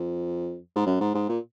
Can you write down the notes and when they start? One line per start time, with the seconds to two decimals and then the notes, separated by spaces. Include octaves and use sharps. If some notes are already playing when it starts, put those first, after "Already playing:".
Already playing: F2
0.75 G#2
0.86 F#2
1.00 G#2
1.14 G#2
1.29 A#2